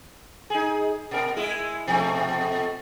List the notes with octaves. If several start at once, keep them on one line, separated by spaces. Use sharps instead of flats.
D#4 G#4
B2 A#4
G#3 E4 G#4
B2 F3 A3